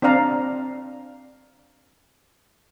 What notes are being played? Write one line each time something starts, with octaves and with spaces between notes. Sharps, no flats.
C4 D4 D5 F5 A#5